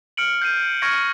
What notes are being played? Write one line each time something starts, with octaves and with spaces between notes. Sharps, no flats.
F6 C#7 D7 F#7
G6 C7 D#7
C#6 F6 G#6 A#6 C#7 D7